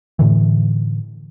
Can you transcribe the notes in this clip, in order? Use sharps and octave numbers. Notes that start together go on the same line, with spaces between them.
A2 D3 E3